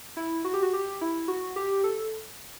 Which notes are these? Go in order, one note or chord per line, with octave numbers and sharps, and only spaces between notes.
E4
F#4
G4
F#4
G4
E4
F#4
G4
A4